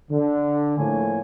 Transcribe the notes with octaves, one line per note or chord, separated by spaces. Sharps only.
D3
A2 F3 A3 A#3 C#5 G#5